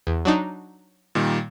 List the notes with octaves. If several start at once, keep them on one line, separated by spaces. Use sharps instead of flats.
E2
F#3 D4 D#4
A#2 D#3 G3